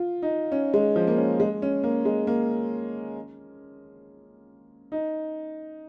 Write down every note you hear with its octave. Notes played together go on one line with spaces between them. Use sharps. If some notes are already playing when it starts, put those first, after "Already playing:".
Already playing: F4
D#4
C#4
G#3
F3
A#3
C#4
G#3
C#4
A#3
G#3
A#3
D#4